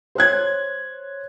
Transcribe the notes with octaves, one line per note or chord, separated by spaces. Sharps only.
C5 C#5 F#6 G#6